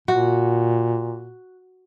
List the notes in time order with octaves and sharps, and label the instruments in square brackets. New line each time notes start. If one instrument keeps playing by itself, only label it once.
[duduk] A#2 [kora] F#4